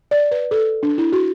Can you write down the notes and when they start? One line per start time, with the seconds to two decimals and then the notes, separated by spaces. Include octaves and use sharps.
0.11 D5
0.31 B4
0.51 A4
0.83 D4
0.98 E4
1.12 F#4